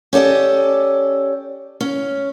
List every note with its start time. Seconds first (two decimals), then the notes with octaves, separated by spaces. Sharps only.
0.13 C#4 G4 A4 D5 D#5
1.81 C#4